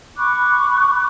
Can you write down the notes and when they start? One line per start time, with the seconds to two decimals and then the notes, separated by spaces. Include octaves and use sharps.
0.17 B5 C#6 D6 F#6